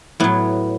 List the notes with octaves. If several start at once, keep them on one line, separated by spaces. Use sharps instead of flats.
A2 F#3 B3